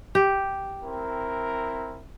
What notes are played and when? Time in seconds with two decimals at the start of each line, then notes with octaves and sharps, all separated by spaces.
0.15 G4
0.84 C4 E4 A#4